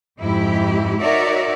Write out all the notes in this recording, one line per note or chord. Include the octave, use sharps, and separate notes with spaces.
F2 G#2 E4 G4
D#4 F#4 A#4 C#5 D5 E5